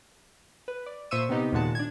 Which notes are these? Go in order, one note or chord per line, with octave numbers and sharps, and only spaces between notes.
B4
D5
A#2 C5 E5 C#6 E6 D#7
C3 B3 D#4 G4
D#2 A#2 G#3 F#4 A5
D4 G#6